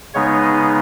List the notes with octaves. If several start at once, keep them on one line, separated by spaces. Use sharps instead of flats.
C#3 G#3 B3 D#4 C#5